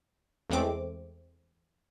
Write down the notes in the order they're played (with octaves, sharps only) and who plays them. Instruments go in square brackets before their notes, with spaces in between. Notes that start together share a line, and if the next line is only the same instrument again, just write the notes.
[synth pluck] E2 G#3 A3 C4 D6